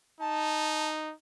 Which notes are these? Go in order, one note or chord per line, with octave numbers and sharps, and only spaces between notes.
D#4 A5